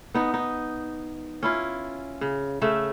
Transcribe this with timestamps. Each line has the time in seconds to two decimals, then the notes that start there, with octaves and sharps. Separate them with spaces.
0.14 B3 D#4
0.34 D#4
1.43 C#4 E4 F4
2.21 C#3
2.62 C#3 A3 E5